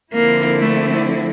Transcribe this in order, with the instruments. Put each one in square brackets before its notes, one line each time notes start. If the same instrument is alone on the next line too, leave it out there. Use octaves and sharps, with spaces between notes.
[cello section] D3 F3 C4 E4 [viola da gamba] A#3
[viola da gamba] A3